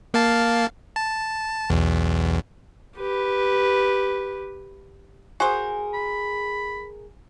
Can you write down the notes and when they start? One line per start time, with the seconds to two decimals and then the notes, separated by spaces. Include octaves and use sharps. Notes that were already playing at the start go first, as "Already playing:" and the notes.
0.14 A#3 F5 A5
0.96 A5
1.70 B1 E2
2.98 G4 B4
5.40 F#4 G#4 A#4 C5 G#5
5.94 B5